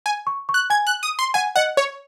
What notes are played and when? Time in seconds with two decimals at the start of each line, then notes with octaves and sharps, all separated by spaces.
0.06 G#5
0.27 C#6
0.49 C#6
0.54 F#6
0.70 G#5 G#6
0.87 F#6
1.03 D#6
1.19 C6
1.34 F#5 G#5
1.56 D#5 F#5
1.77 C#5